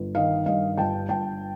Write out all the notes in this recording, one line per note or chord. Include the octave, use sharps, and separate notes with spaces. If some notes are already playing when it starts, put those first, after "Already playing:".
Already playing: G1
D#3 D#5 F5
G2 D#5 F5
G1 G5 A5
G1 G5 A5